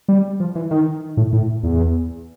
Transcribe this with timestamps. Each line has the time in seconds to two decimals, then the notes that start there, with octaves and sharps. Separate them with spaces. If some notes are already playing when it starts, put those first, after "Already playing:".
0.08 G3
0.40 F3
0.55 E3
0.71 D#3
1.17 A2
1.33 A2
1.63 E2